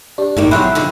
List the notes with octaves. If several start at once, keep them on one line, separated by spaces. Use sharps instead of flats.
D4 G4
G1 A2 D#3 A#3
E2 F#3 C#5 E5 G5 B5 C6 F#6
G2 D3 F3